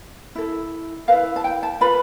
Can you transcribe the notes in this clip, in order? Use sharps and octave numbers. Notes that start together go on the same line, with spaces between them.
E4 A4
E4 B4 F5
A5
G5
A5
F4 B4 B5